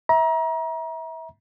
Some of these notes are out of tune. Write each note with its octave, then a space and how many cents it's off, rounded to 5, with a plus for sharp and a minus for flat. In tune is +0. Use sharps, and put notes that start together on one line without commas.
E5 -25 A#5 +30